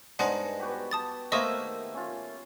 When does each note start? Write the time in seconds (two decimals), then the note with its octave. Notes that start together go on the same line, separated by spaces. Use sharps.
0.19 G2 G#3 D4 D#4 C5 D#5 F#5
0.60 B3 F#4 G4
0.91 A5 D#6 A6
1.32 D#3 A3 A#3 C5 D#5 E5 C#6 D#6
1.94 C#4 F4